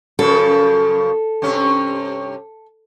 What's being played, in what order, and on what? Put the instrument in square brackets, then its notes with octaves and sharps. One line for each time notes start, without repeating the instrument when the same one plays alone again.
[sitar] F#2 C#3 F3 [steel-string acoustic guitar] A4
[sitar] G2 C3 C#4